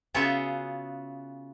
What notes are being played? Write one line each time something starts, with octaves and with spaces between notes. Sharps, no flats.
C#3 B3 F4 F#4 G#4 E5